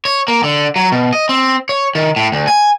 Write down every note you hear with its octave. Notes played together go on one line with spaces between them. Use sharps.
C#5
A#3
D3
F#3
B2
D#5
C4
C#5
D#3
A2
D2
G#5